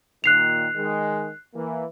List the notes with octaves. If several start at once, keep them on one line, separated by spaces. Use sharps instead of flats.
A#2 D#3 F#6 C7 F7
D#3 G#3
E3 A#3